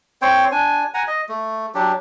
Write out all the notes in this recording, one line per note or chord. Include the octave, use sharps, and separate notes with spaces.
C4 C5 C#5 G5
D4 G#5
F#5 G#5 A#5
D#5
A3
F#3 D4 G4